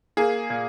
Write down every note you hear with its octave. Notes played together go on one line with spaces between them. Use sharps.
A#3 G#4
A#2